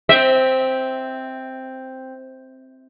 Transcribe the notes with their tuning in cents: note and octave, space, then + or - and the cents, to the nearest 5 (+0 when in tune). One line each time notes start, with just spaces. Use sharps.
C4 +0 E5 -25